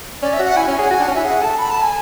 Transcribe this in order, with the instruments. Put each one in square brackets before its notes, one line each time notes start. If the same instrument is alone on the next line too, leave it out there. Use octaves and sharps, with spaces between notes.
[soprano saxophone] C#4 [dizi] D5
[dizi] E5
[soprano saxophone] F#4
[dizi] F#5
[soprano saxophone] E4 [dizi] G#5
[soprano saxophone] C#4 [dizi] G#5
[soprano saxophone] G#4 [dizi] F#5
[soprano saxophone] F#4 [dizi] G#5
[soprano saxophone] D4
[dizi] F#5
[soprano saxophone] C#4
[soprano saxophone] E4 [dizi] E5
[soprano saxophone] G#4 [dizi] F#5
[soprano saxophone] A4 [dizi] A5
[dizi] B5
A5
G#5